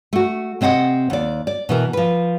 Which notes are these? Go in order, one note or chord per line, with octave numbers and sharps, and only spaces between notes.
A3 F#4
C3 C4 D#5 F5 F#5
D#2 D5
D5
B2 E3 A#4
F3 B4